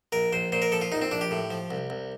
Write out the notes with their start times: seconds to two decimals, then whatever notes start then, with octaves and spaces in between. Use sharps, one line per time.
0.12 A#1 A#4
0.33 A#1 C5
0.52 A#2 C5
0.62 A#4
0.72 F3 A4
0.81 F4
0.92 A#1 D#4
1.02 C4
1.11 A#1 D4
1.21 G4
1.31 A2
1.50 F3
1.71 C2
1.90 C2